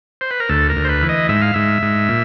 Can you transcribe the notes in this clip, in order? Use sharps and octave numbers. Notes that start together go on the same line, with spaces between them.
C5
B4
A#4
D2 A4
A#4
D2
C5
B4
E3
D#5
G#2 E5
F5
G#2 E5
G#2
A#2